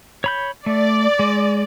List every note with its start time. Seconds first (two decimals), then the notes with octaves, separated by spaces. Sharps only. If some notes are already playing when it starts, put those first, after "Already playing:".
0.24 C#5 B5 G6
0.66 A3 D5
1.19 G#3